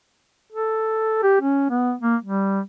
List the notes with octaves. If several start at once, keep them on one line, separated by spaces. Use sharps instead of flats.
A4
G4
C#4
B3
A#3
G3